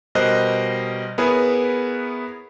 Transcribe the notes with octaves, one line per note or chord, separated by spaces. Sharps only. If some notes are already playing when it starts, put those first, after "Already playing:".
B2 G3 A#4 C5 D#5 F#6
B3 E4 G#4 A#4 B4 C#5